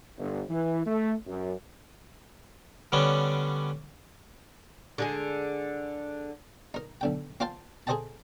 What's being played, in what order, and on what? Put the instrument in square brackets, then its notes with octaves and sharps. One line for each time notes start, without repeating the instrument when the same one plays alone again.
[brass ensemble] G1
E3
A3
F#2
[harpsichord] D3 G3 B3 C#4 D4
[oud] D3 G#3 G#4
[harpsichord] D#4 A#4
B1 D3 G5
C4 F4 C5 F5 G5 A5
G#4 A4 C5 D#5 G5 A5